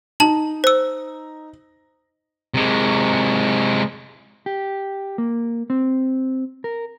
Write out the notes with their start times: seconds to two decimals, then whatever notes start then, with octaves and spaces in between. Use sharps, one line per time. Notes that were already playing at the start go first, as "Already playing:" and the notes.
0.20 D#4 A5 F#7
0.64 C5 E6
2.54 C3 G#3
4.46 G4
5.18 A#3
5.70 C4
6.64 A#4